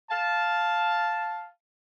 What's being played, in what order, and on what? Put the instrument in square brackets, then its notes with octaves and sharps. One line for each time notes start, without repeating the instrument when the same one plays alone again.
[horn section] F5 A5